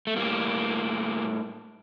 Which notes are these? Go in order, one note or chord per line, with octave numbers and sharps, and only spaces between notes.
A3
A2 G3 A#3